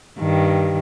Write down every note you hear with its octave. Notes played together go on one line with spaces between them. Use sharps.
G2 D#3